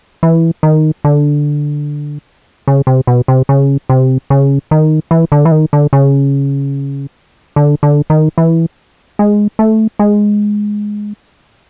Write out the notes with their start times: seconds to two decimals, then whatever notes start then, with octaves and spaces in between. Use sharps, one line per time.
0.23 E3
0.63 D#3
1.05 D3
2.68 C#3
2.87 C3
3.07 B2
3.28 C3
3.49 C#3
3.90 C3
4.30 C#3
4.71 D#3
5.11 E3
5.32 D3
5.45 E3
5.52 D#3
5.73 D3
5.93 C#3
7.56 D3
7.83 D3
8.10 D#3
8.38 E3
9.19 G#3
9.59 A3
9.99 G#3